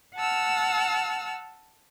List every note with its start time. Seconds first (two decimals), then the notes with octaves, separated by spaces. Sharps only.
0.16 F#5 A5 E6 F6